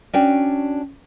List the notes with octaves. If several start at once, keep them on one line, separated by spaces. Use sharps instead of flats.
C#4 D4 F#4 D5 G5